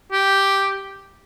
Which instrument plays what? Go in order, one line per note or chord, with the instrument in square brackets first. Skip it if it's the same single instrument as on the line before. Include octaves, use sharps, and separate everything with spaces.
[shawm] G4